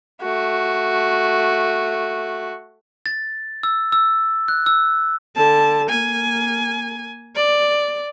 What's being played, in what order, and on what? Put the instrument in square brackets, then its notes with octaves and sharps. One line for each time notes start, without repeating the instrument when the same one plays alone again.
[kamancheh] A3 F#4
[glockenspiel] A6
E6
E6
F#6
E6
[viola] D3 A5
A#3 G#5
D5